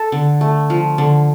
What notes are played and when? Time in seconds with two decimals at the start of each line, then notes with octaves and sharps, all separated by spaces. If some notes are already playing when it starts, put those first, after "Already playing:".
Already playing: A4
0.12 D3
0.41 A3
0.70 F3
0.98 D3